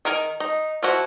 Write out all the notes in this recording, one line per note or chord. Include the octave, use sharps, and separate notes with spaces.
D#3 A#4 G#5
D#4
F3 E4 F#4